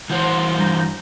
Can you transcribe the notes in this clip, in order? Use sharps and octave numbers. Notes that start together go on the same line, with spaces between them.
E3 F#4 C5 G6
G2 A#5